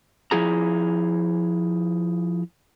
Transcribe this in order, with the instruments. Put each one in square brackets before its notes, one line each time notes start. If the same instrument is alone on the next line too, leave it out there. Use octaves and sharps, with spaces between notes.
[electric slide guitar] F3 E4 G#4 A#5